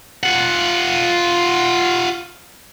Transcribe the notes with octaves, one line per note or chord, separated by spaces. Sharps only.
F4 F#5